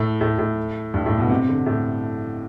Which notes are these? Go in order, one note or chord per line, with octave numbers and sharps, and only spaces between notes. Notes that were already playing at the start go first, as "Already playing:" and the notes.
Already playing: A2
A2
A2
G2
A2
B2
C3
D3
A2